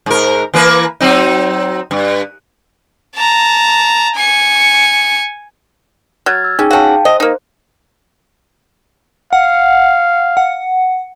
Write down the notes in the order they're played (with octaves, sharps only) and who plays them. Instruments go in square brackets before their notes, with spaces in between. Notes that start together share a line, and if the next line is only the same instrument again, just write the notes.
[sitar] G#2 A#4
E3 A#3 B4
F#3 C4 D#4
G2
[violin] A5 A#5
G#5 C#7
[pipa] F#3 [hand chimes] F6 G#6 A6
[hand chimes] E6
[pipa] C#4 [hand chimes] D#4 G#4 G5
[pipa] C#4 F#4 [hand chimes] F5 G5 A5
[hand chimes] C5 [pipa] D#5
[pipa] A#3 D#4
[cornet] F5 [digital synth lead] F#5
[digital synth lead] F#5